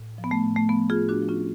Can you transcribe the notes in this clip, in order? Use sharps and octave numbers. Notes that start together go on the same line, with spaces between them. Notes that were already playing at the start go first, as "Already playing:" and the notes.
Already playing: A2
F3
B3
A3
A2
A3
F3 B3
F4 G#4
A2
D4 F#4
F3
C#4 F4